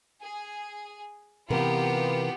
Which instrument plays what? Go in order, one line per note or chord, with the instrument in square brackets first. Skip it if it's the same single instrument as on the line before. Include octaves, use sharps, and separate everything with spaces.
[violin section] G#4
[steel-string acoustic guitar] C3 E3 A#4 [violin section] B3 F4 G4